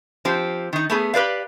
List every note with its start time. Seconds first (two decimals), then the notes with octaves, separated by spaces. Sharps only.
0.25 F3 C4 G4
0.73 D#3 D#4
0.90 A3 B3 G#4
1.14 G4 B4 D5 F5